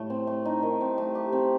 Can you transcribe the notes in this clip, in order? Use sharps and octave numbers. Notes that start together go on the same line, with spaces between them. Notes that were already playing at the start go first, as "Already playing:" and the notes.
Already playing: A2 A3
C4
A3
D#4
D#3
C4
A3
G4
C4